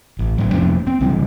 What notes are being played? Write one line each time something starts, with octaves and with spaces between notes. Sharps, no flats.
A1
A2 F#3
F2 C3 F3 C#4
C4
C#2 C3 E3 G3